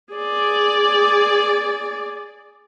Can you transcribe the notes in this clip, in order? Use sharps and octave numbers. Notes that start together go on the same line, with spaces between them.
G#4 D5